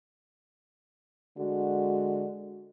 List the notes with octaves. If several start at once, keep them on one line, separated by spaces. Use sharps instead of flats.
D3 G#3 F#4